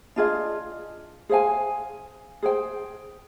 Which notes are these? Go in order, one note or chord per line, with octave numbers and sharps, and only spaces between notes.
D4 F4 G#4 D#5
G#4 C5 F5 G#5
G#4 C5 G5